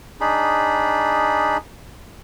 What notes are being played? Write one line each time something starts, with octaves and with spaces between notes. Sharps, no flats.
D4 D#4 G#4 B5